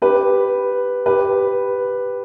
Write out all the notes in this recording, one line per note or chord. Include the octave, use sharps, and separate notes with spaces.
G4 B4
G4 B4